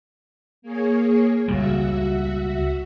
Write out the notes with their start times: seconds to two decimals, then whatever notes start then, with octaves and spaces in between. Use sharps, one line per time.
0.62 A#3 G#4 C#5
1.48 C#2 A#2 G3 F#4 E5